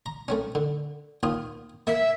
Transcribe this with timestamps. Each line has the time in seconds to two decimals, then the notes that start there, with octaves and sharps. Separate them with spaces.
0.06 A#5
0.28 A3 C4 C#4
0.55 D3
1.23 D#2 F4 D#6
1.87 A#3 E5